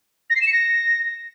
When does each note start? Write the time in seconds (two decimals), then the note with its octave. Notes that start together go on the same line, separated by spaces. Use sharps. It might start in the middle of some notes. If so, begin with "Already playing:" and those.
0.30 A#6
0.36 C7
0.41 E7
0.47 C#7
0.53 A#6